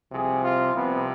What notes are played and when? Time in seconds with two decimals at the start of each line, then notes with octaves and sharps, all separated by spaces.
0.12 C2 C3 F3 G#4
0.43 F4
0.74 C2 C3 F3 B3